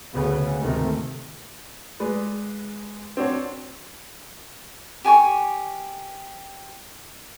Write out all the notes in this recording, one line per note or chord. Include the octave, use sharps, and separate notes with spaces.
D2 C#3 B3
D2 G#2 C3 D#3 A3
G#3 B4 D5
C4 D4 F#4 C#5
G4 G#5 A5 C#6